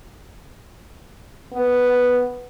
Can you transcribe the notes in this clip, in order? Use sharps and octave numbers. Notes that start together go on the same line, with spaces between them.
B3